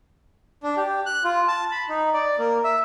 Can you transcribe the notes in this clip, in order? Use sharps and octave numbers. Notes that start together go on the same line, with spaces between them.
D4
G4
F#6
F4
A5
B5
D#4
D5
A#3
E5